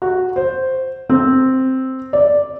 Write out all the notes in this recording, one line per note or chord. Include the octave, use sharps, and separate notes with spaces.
F#4
C5
C4
D5